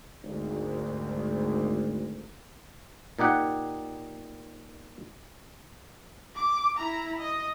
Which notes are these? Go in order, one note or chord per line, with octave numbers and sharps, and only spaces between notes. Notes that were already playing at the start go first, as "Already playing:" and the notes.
G#1 D2
A#2 D#4 G4 F#5
D6
E4 A#5
D#5